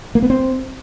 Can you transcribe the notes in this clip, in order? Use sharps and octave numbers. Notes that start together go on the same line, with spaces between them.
A#3
B3
C4